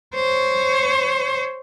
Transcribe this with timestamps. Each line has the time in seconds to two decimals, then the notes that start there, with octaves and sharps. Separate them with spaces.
0.15 C5 C#5